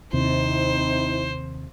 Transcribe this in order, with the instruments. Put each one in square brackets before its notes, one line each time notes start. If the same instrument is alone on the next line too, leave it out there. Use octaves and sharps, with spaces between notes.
[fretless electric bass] D#2 C3 [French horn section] C4 D#4 E4 [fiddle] C5